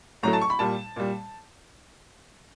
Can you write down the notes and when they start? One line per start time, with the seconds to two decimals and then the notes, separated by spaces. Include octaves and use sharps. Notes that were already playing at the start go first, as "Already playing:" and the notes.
0.23 A2 F#3 A3 A#5
0.33 A5
0.41 C#6
0.50 B5
0.59 A#2 G3 A5
0.96 A#2 G3